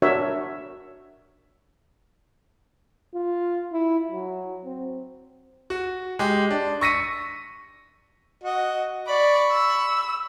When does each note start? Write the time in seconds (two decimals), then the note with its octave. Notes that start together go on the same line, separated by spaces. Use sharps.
0.02 D4 F#4 A#4 C#5 E5
3.14 F4
3.73 E4
4.11 F#3
4.65 C4
5.70 F#4
6.19 G#3 G4
6.50 D4
6.81 C#6 E6 A#6 B6 C#7 D#7
8.43 F#4 D#5
9.08 D5 B5 C#6
9.52 E6